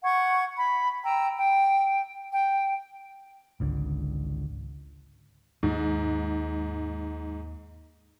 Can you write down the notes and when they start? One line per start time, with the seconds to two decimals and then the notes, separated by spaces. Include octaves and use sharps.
0.03 F#5 C#6 G#6
0.57 B5
1.03 G5 A#5 E6
1.37 G5
2.32 G5
3.60 G#1 C#2 D3
5.63 D#2 G#2